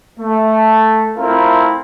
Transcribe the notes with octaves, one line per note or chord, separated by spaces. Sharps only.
A3
A3 C4 E4 F4 A#4